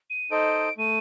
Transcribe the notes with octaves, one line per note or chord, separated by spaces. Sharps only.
D#7
D#4 A4 C5 D#5 D7
A3 D#7